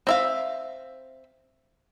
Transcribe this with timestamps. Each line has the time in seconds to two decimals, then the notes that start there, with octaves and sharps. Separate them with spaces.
0.07 C4 E5 F5